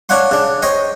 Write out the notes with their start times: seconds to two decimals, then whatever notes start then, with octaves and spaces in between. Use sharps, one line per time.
0.09 D4 C#5 F5 F#5 C6
0.31 C#3 D4
0.62 C5 C#5 D#5 G5 C6